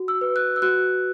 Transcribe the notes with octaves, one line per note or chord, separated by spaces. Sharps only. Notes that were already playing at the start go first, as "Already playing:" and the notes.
Already playing: F#4
E6
B4
F#6
E6
F#4 F#6